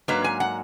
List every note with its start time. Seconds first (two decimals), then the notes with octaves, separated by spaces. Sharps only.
0.08 G#2 F#3 A#3 D4 B4
0.24 G#5
0.40 F#5